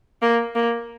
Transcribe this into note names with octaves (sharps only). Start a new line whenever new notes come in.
A#3
A#3